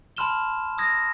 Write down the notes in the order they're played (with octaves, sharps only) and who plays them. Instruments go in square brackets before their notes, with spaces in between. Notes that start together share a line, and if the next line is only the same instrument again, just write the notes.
[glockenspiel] A5 B5 C6 F6 E7 G7
D#6 E6 G#6 A#6